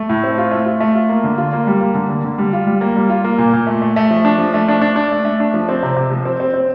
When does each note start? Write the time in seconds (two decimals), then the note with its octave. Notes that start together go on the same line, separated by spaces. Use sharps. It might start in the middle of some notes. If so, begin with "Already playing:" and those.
Already playing: A3
0.09 A2
0.24 C4
0.38 F4
0.51 A3
0.66 F4
0.80 A3
0.95 F4
1.09 A#3
1.24 D3
1.38 F4
1.53 A#3
1.67 G3
1.81 A#3
1.95 D3
2.09 A#3
2.24 D3
2.38 G3
2.53 F4
2.67 G3
2.81 A#3
2.96 G3
3.10 F4
3.24 A#3
3.38 A#2
3.53 A#2
3.67 A3
3.82 A3
3.96 A3
4.11 F3
4.25 D4
4.38 F3
4.54 A3
4.68 D4
4.81 D4
4.96 D4
5.11 A3
5.25 A3
5.40 D4
5.54 F3
5.69 C4
5.83 C3
5.96 C3
6.11 F3
6.25 C4
6.40 C4
6.54 C4